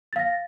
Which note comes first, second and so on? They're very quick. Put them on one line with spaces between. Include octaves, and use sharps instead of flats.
A6 F5 A#6